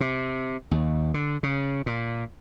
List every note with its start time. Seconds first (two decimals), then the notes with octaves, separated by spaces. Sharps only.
0.01 C3
0.71 D#2
1.14 D3
1.43 C#3
1.86 A#2